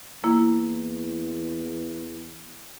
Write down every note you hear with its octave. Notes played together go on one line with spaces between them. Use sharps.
E2 A#3 E4